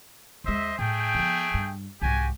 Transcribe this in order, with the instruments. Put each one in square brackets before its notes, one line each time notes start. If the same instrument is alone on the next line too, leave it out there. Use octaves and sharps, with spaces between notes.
[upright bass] D#2 G#3 [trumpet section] C5 D#5 E5
[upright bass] A2 [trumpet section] A3 G#4 G5
[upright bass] F3 B3
G2
[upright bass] C2 G#2 [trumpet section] F#4 G4 G#5